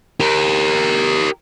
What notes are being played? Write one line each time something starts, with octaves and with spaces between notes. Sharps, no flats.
G4 A#4